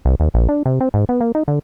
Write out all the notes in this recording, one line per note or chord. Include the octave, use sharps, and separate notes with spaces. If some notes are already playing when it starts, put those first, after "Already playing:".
C2
D#2
A#1
D4
C3
C4
G#2
B3
A#3
D#4
D3